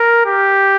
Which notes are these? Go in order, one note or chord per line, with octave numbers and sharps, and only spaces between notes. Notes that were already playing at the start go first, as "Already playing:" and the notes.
Already playing: A#4
G4